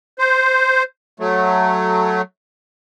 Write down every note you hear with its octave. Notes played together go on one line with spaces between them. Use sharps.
C5
F#3 A3